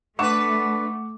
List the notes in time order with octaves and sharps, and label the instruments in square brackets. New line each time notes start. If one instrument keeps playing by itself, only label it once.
[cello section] A3 [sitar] D4 B4 [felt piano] F#5 C#6 E7 [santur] D6